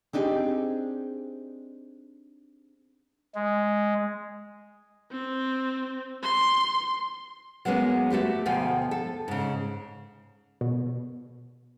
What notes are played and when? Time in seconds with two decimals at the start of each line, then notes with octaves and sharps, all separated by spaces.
0.13 C4 D4 D#4 G4 G#4
3.34 G#3
5.11 C4
6.23 C6
7.65 F#3 G#3 A#3 B3 C#4
8.10 A3 F#4 G4 B4
8.46 D2 B2 F3 G5 G#5
8.91 A4
9.28 G#2 C#3
10.61 B2